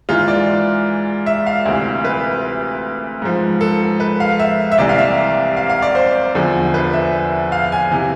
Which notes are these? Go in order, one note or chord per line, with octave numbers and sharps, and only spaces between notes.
G#2 E3 F4
D5
E5
F5
D2 C3 E3
B4
G#2 F3
A4
B4
F5
E5
E5
C2 C3 E3 D5
F5
E5
F5
F5
D5
C5
E2 D3 F3
B4
E5
F5
G#5
C3 E3